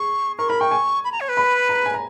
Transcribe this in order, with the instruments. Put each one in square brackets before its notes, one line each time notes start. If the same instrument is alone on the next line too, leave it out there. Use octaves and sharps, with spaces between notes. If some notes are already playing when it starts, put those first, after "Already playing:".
Already playing: [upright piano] G#4 [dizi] C#6
[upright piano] A#4 [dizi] C#6
[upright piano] A#4 [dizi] B5
[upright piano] G5 [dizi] C#6
[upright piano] G#5
[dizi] B5
A#5
C#5
B4
[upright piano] B5
A#5
G#5
A#5